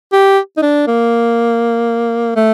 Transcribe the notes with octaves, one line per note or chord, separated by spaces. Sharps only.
G4
D#4
D4
A#3
A3